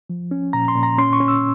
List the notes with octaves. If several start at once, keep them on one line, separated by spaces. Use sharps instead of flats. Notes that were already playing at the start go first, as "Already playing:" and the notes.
F3
C#4
A#2 A#5
C6
A#2
A#5
C#4 C6
C#6
C#4
E6